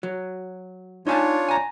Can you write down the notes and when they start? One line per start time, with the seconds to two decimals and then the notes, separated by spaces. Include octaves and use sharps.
0.03 F#3
1.07 D4 D#4 F4 C#5 G#5 A5
1.48 G#5 A#5